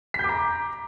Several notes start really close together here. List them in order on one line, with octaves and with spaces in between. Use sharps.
B6 G6 D6 A#5